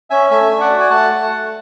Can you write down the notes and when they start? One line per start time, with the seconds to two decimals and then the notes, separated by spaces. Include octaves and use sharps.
0.10 C#4 E5 G#5
0.30 A3 E5 G#5
0.51 D4
0.60 D5 F#5
0.70 F#4
0.80 G#5
0.90 A3 F#5 A5
1.10 A3
1.30 A3